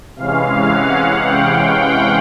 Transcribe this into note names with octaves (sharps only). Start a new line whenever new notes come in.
C3 E3 G#3 C#4 F5
F#5
G5
F#5